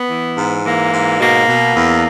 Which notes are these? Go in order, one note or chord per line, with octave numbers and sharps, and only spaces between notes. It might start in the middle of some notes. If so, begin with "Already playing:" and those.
Already playing: B3
E3
G#2
E3 A#3
G#2
B2 A#3
B2
E2